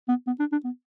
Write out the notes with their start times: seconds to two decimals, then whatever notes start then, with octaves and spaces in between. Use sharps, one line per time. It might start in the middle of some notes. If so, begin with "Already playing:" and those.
0.08 B3
0.27 B3
0.39 D4
0.52 D4
0.64 B3